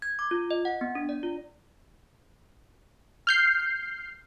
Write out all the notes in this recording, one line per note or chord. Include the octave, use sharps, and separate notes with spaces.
G#6
D6
F4
D#5
F#5
B3
D4
D5
F4
F6 G6 C7